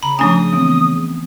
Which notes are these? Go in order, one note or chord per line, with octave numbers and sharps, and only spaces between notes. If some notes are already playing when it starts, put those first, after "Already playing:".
C#3 A#5 B5
F3 A3 C#4 D4 G#5 D#6
E3 B3 C4